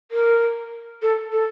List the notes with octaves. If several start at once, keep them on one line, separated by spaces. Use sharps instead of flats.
A#4
A4
A4